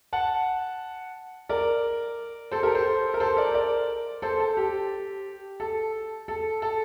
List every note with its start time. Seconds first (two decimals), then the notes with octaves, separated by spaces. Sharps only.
0.13 F#5 A5
1.49 A#4 D5
2.52 A4 C5
2.63 G4 A#4
2.75 A4 C5
3.14 A#4
3.20 A4 C5
3.37 A#4 D5
3.54 A#4 D5
4.22 A4 C5
4.40 A4
4.57 G4
5.60 A4
6.28 A4
6.62 A4